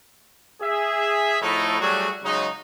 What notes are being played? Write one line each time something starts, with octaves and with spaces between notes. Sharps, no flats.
G#4 E5
A2 F3 A3 D#4 E4
F#3 G3 A3 F#4 G#4
C#3 F#3 G#3 D#4